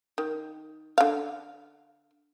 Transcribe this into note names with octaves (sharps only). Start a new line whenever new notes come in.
D#3
D3 F5